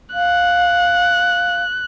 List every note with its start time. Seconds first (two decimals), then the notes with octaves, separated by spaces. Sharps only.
0.14 F5 F#6